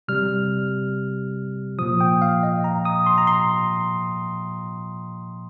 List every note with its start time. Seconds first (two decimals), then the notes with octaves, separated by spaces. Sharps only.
0.08 C3 G3 F6
1.78 A#2 F3 D#6
2.01 G5
2.22 F5
2.43 D#5
2.64 A#5
2.85 D#6
3.06 C6
3.18 A#5
3.27 C6